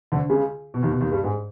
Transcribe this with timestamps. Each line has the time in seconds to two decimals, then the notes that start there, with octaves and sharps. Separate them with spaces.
0.12 D2 D3
0.29 C#2 C#3
0.74 B2
0.82 D#2 D#3
0.91 B2
1.01 D#2 D#3
1.12 G2 G3
1.24 G#2 G#3